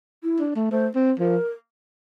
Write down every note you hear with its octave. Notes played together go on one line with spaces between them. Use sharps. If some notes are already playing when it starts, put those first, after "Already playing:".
E4
D4
A3
A3 C5
C4
F3 A#4